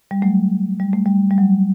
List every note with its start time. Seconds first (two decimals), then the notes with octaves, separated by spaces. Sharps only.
0.11 G3
0.22 F#3 A3
0.80 G3
0.93 A3
1.06 G3
1.30 G3
1.38 F#3